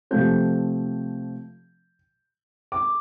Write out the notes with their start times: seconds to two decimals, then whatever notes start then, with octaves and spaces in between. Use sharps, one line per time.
0.11 C3 F3 A3 C4 G6
2.72 D6